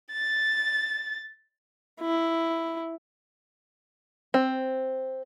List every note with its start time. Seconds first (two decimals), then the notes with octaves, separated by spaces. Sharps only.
0.13 A6
2.01 E4
4.34 C4